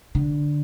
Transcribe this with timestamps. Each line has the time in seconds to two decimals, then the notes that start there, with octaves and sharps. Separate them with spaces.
0.15 D3